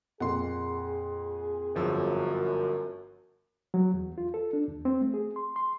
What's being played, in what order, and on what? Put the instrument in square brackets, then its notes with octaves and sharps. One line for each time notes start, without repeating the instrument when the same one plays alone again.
[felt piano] F2 A#2 [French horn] G#4 [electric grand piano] F#5 C6
[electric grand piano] G1 F3 E6 [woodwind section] F#2
[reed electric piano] F#3
E2
F4
A4
D4
D#2
C4
A3
G#4
C6
C6